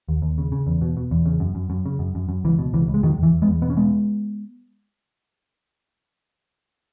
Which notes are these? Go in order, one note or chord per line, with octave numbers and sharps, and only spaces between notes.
D#2
D#2
C#3
C#3
E2
B2
B2
E2
C#3
F#2
F#2
F#2
C#3
F#2
F#2
F#2
C#2 E3
B2
C#2 E3
C#2
G#3
E2 D#3 F#3
E2
E3
E2
G#3 B3
E2
B2 B3
C#4
B2 G#3 B3